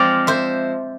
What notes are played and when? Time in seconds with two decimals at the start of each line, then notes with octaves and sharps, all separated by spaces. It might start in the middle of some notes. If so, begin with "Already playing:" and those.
Already playing: F3 G#3 C4 D5 F5
0.27 C5 E5